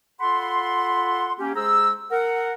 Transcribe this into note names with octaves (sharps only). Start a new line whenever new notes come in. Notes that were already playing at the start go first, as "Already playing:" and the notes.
F4 A4 F#5 B5 C6
A#3 C#4 G4
G#3 G#4 C5 A#5 E6
A#4 F#5